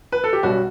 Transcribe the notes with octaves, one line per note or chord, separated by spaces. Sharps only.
B4
A4
G4
B1 B2 G3 C#4 F#4